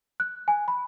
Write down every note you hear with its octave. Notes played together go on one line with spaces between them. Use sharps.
F#6
G#5
B5